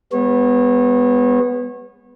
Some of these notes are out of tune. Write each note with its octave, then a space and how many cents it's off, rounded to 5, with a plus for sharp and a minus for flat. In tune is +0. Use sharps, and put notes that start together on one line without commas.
G#3 -45 B3 +0 C#5 -30